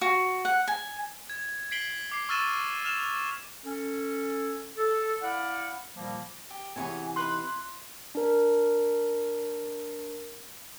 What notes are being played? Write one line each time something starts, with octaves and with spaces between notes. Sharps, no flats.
F#4
F#5
G#5
G#6
G#6 B6 C7 D7 F#7 G7
D6 C7
C#6 E6 F6 A6 D#7 E7
F6 E7 F7
C#4 A4
A4
E4 D5 F5 F#5
A#2 D#3 F3 G3 A#3
G4
C3 E3 B3 G#4 C#5 G#5
D#4 B4 B5 C6 F#6
E4
D4 A#4